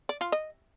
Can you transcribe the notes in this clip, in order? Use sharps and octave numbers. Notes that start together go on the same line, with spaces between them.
D5
F4
D#5